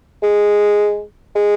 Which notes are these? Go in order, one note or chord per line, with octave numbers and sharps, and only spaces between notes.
G#3
G#3